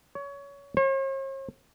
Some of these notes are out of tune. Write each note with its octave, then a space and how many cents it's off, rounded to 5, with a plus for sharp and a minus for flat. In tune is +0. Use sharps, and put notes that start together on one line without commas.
C#5 +25
C#5 -45